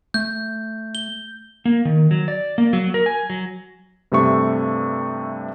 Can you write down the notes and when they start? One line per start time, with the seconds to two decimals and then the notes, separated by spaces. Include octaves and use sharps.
0.14 A3 G6
0.95 G7
1.65 A#3
1.85 D#3
2.11 F#3
2.28 D5
2.58 A#3
2.73 F#3
2.94 A#4
3.06 G#5
3.30 F#3
4.12 G2 C3 A3 C#6